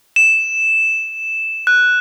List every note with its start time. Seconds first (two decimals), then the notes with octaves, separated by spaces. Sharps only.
0.16 E7
1.67 F#6